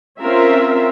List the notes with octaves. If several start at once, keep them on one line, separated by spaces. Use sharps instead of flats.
C4 C#4 F4 A#4 E5